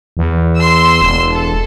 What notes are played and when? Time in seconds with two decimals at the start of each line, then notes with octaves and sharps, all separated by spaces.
0.17 E2
0.58 C6 E6
1.01 E1
1.31 A4